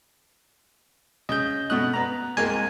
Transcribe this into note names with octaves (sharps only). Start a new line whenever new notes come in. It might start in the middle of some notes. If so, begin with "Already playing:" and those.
C#3 D#5 G6
B2 A3 D#6 F#6
B3 A#5
C2 G#3 A#3 G#5